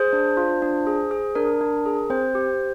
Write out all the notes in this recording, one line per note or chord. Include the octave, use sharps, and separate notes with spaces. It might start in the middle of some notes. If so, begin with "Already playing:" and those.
Already playing: G#4 C5
D4
F4
D4
G#4
G#4
D4 A#4
D4
G#4
C4 C5
G4